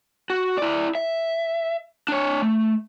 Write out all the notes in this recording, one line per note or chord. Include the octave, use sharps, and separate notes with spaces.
F#4
E4 D5
E5
D4 C#5
A3